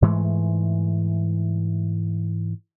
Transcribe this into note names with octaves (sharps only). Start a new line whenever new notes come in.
G#2 E3 G#3 A3